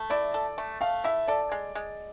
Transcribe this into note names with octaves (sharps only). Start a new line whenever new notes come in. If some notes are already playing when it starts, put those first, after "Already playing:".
Already playing: A3
E4 D5
A4
A3
A3 F5
E4 E5
A4 D5
G#3
G#3